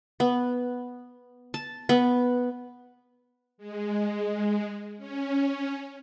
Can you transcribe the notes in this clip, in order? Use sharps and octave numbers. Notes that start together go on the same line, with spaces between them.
B3
A5
B3
G#3
C#4